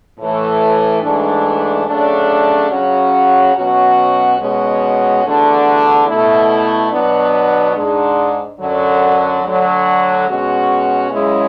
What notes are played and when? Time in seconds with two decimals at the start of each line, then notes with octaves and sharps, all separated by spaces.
0.18 A2 E3 A3
1.02 G#2 E3 A3 D4
1.87 C#3 F#3 A3 D4
2.70 C#3 F#3 C#4 F#4
3.54 B2 F#3 C#4 F#4
4.38 B2 G#3 C#4 F#4
5.23 E2 D3 A3 D4 F#4
6.07 B2 A3 E4
6.91 B2 F#3 B3 D4
7.75 G#2 G#3 D4
8.60 F#2 D3 F#3
9.43 D2 D3 F#3
10.28 B2 G#3 C#4 F#4
11.12 F#2 C#3 G#3 C#4 E4